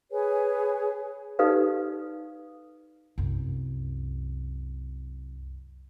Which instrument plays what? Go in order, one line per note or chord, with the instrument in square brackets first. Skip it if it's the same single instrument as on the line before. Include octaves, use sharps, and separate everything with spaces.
[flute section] G#4 B4 C#5 G#5
[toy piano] D#4 G4 A4 B4 D5 F5
[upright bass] C2 F#2